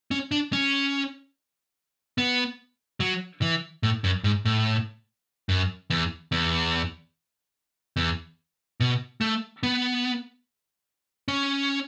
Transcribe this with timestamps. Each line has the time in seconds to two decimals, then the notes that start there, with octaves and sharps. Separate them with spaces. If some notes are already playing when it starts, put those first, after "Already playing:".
0.11 C#4
0.31 D4
0.53 C#4
2.18 B3
3.00 F#3
3.42 E3
3.83 A2
4.04 F#2
4.24 G#2
4.45 A2
5.49 F#2
5.90 E2
6.32 E2
7.96 E2
8.80 B2
9.21 A3
9.63 B3
11.28 C#4